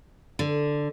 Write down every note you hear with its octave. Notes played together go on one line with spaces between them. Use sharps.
D3